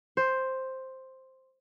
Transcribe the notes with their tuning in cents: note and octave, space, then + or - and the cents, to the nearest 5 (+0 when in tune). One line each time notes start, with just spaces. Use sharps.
C5 +5